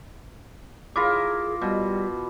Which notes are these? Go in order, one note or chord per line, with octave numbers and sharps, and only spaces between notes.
E4 F4 G#4 A#4 D6
B2 G3